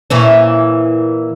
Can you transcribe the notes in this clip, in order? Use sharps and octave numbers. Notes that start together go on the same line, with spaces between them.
A#2 E3 C#4